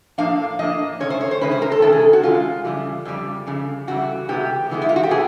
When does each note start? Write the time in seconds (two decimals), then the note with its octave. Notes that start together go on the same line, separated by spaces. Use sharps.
0.18 A2 F3 A#3 D4 F5
0.59 A2 F3 A#3 D4 D#5
1.00 C3 D#3 G#3 C#4 C#5
1.10 C5
1.21 C#5
1.31 C5
1.41 C3 D#3 G#3 C#4 B4
1.51 C5
1.62 A#4
1.72 A4
1.82 C3 D#3 G#3 C#4 A4
1.93 G#4
2.13 F#4
2.23 C3 D#3 G#3 C#4 F4
2.65 F2 C#3 E3 G3
3.05 F2 C#3 E3 G3
3.47 F2 C#3 G3
3.87 F2 C#3 E3 G3 F#4
4.29 C3 E3 G#3 B3 G4
4.70 C3 E3 G#3 B3
4.82 E4
4.89 F4
4.96 F#4
5.03 G4
5.10 C3 E3 G#3 B3 G#4